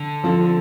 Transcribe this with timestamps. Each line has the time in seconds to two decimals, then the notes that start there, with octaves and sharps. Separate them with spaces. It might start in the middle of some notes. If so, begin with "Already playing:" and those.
Already playing: D3
0.24 F3 C4 A4